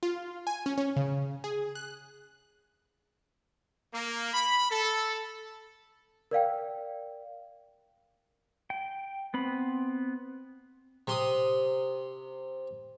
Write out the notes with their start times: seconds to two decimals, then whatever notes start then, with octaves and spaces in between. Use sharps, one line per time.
0.03 F4
0.47 G#5
0.66 C#4
0.78 C#4
0.96 C#3
1.44 G#4
1.75 F#6
3.93 A#3
4.34 B5
4.71 A4
6.31 A#4 D5 F5 G5
8.70 G5
9.34 B3 C4 B5
11.08 C3 C6 D#6